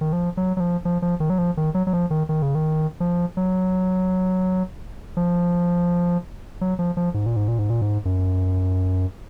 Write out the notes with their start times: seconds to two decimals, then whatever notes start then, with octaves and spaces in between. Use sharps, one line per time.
0.01 D#3
0.13 F3
0.37 F#3
0.57 F#3
0.60 F3
0.85 F3
1.02 F3
1.20 D#3
1.30 F#3
1.38 F3
1.57 D#3
1.74 F#3
1.87 F#3
1.93 F3
2.10 D#3
2.29 D#3
2.42 C#3
2.55 D#3
3.00 F3
3.37 F#3
5.17 F3
6.61 F#3
6.79 F3
6.97 F3
7.14 G#2
7.26 A#2
7.36 G#2
7.48 A#2
7.59 G#2
7.70 A#2
7.82 G#2
8.05 F#2